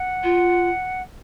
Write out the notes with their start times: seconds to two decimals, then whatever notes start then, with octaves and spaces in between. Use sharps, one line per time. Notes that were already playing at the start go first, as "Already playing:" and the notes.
Already playing: F#5
0.24 F4